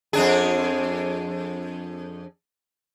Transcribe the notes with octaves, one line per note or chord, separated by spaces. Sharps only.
F2 D4 G#4